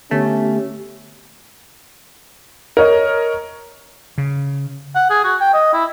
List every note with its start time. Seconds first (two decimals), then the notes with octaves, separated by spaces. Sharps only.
0.11 D3 A3 B3 C#4 G4
2.77 A#4 C#5 D#5
4.18 C#3
4.95 F#5
5.10 G#4
5.24 F#4
5.41 G5
5.53 D#5
5.73 E4